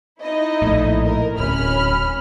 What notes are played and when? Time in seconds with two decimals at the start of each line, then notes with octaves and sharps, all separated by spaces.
0.22 D#4 E4 D#5
0.62 A#1 A2
1.06 A#4
1.38 D1 C#4 B5 F6